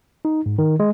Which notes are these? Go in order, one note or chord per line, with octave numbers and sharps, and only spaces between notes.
D#4
G#2
D#3
G#3